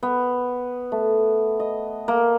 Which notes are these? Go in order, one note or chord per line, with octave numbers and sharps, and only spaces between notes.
B3
A3
D#5
A#3